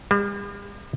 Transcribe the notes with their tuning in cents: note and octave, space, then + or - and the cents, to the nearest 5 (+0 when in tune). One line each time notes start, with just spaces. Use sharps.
G3 +45